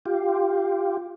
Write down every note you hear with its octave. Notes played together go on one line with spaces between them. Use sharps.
F4 G4